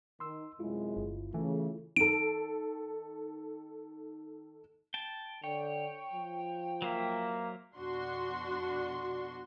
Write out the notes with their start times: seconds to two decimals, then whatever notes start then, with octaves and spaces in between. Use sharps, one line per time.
0.20 D#3 C6 E6
0.60 F#2 C3 G#3 E4 F4
0.97 G1
1.34 C#3 E3 A3
1.96 D#3 A4 D7
4.94 G5 A5
5.44 D3 C#5 G5
6.13 F3
6.82 F#3 A#3 C5 E5
7.75 F2 B2 D4 F#4 C6 C#6